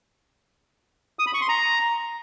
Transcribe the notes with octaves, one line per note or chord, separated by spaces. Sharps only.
D#6
B5
C#6
C6
A#5